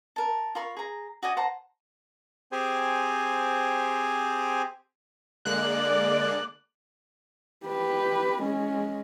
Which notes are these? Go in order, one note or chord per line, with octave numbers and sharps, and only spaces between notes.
A#4 A5
F4 A#4 B5 C#6
G#4 A#5
F#4 D5 D#5 G#5
C5 F#5 A5 A#5
C4 G4 G#4 C5 G#5
D3 G#3 A#3 D5 F#6
G4 B4
G#3 C#4